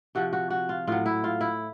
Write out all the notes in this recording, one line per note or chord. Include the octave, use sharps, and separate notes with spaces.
C3 F3 F#4
F#4
F#4
F4
A2 F#3 F4
E4
F4
E4